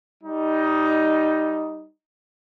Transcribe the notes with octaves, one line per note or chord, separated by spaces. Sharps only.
G3 D#4